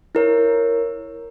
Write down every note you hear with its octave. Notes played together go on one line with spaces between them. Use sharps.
E4 A#4 C#5